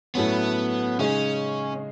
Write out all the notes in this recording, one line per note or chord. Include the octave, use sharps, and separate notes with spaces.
A2 F#3 A3 B3 C#4
C#3 G#3 C#4 D#4 G#4